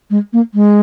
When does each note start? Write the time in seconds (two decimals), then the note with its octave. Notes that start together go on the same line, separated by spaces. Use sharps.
0.10 G#3
0.33 A#3
0.54 G#3